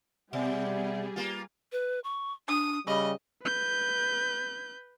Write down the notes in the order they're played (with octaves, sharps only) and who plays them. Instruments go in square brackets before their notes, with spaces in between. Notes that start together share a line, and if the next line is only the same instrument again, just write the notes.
[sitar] B2 [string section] G3 G#4 [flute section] D5 E5 F#5
[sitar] A#3 F4
[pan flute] B4
C#6
[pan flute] D4 [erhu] D#6
[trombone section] C#3 G3 [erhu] D#5 [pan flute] B5
[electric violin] B4 G6